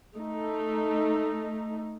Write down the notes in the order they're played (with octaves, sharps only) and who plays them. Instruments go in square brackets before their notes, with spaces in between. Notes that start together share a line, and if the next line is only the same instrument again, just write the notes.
[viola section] A3 D#4